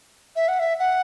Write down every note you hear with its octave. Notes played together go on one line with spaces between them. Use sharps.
E5
F#5
E5
F#5